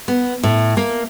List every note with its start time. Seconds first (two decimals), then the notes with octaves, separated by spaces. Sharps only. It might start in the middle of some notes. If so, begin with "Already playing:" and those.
0.08 B3
0.43 A2
0.77 A#3